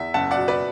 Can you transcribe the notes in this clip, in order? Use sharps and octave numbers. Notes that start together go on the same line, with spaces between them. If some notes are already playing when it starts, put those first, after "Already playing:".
Already playing: E2 E5
F#1 F#5 A5
D5 F#5
B2
B4 D5